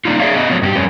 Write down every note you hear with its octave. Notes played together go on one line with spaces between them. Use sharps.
A#3 D4 D#4 F4
G#4 A4 C#5 D5 E5 F5
B3 C#4 D#5
F3 F#3 B3 C#4
G2 F#4 G4
F2 G3 C#4 B4 C#5